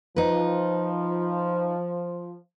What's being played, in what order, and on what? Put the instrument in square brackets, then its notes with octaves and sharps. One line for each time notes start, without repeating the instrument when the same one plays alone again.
[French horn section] F3 [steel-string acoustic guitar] D#4 B4